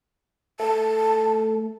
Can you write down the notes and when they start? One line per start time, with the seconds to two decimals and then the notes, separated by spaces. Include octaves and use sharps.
0.60 A3 A5